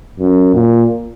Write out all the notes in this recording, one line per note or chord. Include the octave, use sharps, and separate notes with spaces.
F#2
A#2